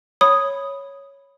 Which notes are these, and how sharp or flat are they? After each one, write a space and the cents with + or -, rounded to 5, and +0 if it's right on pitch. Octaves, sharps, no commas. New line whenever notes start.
C#5 +0 B5 +0 D#6 +0